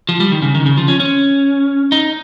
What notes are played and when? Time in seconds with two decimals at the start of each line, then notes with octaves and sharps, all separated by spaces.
0.09 F3
0.20 G3
0.32 D#3
0.42 C#3
0.55 D#3
0.66 C#3
0.78 F3
0.88 C#4
1.00 C#4
1.92 D#4